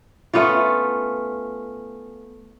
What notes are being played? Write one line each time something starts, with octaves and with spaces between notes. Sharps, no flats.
A3 B3 C#4 F4